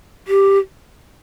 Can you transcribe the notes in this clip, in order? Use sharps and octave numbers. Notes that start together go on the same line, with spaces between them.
G4